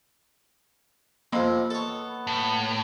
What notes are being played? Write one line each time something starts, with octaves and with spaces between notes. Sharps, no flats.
F2 C3 A#3 D#5 B5
B3 A4 C#5
A2